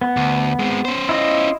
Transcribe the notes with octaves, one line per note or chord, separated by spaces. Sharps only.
B3
D2
G#3 C4
C#4 C5
E4 F4 D#5